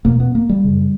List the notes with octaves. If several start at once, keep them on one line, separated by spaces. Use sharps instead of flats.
E2 B2 A#3
B3
A#3
G3
F#2 C#3